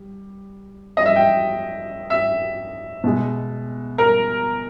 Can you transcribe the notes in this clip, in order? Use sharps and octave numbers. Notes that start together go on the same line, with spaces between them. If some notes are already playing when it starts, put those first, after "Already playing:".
Already playing: G3
D#5
E5
G5
E5
B2 G#3
A#4